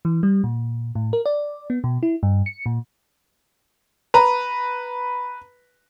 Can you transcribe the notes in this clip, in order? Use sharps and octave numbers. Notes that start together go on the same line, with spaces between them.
E3
G3
A#2
A2
A#4
D5
B3
B2
E4
G2
C#7
A#2
B4 A#5